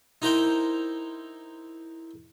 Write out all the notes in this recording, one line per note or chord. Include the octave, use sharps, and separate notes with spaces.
D#4 E4 A#4 C5 G5